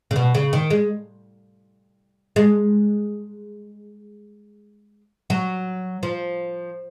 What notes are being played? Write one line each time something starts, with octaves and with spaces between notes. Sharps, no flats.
C#3
B2
C#3
D#3
G#3
G#3
F#3
F3